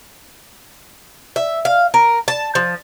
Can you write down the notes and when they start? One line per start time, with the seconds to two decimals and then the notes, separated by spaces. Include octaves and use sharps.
1.36 E5
1.65 F5
1.94 A#4
2.28 A5
2.55 F3